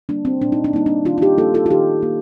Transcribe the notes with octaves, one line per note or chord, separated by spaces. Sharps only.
G3 A#3 D4
C4
A#2 D4
D#4
D4
G3 A#3 D#4
D4
D#3 D4 F4
F4
D#4 G4
G3 A#3 F4 A4
F4 A4
F4
D#3 D#4 G4
A#3